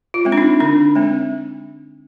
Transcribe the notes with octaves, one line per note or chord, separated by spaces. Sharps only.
F4
G#3 C4
D4
D#4
D3 D4
G#3 C4